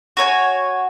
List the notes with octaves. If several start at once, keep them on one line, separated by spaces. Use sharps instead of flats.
F#4 C#5 G#5